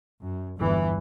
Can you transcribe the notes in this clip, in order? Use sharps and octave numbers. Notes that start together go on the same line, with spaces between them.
F#2
G1 E2 G2 E3